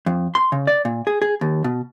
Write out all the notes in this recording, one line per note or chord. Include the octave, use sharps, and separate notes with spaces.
F2
C6
C#3
D5
A#2
G#4
G#4
D#2
B2